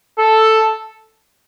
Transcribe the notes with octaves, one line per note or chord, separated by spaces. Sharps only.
A4